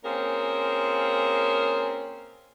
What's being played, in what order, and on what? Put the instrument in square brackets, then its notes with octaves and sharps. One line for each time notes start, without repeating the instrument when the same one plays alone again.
[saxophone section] A#3 C4 C#4 F4 G#4 A#4